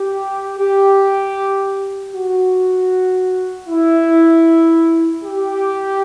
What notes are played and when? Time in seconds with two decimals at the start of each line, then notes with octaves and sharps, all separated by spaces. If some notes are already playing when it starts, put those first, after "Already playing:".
Already playing: G4
0.59 G4
2.13 F#4
3.68 E4
5.24 G4